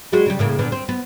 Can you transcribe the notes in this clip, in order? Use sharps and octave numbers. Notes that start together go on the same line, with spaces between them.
G3 G#3 F#4
C#3 G3
A2 C#3 A#3
A#2 D3 B3
C4
B3